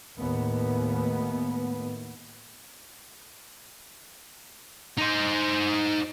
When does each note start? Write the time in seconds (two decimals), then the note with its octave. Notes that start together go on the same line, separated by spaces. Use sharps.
0.17 D#2 A2 B3
4.98 D#4 C5